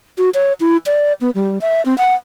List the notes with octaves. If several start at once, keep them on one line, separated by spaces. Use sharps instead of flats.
F#4
C#5
E4
D5
B3
G3
E5
C4
F#5